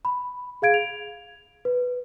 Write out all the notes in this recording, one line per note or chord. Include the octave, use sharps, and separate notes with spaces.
B5
G#4 F5 G#6 D7
F7
B4